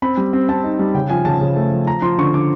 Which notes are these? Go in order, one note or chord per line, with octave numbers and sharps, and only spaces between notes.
C4 B5
G3
C4
C4 A5
D#4
G3
C#3 G5
F3 G#5
C#3 A5
C#3
A3
F3
F3 A#5
F3 C6
D3 C#6
D3 D6